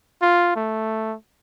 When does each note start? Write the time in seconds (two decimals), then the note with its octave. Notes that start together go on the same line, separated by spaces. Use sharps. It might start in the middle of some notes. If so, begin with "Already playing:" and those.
0.22 F4
0.56 A3